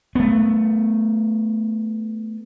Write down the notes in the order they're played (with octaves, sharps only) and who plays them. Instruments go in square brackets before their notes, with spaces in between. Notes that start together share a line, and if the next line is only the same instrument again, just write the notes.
[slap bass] A3 B3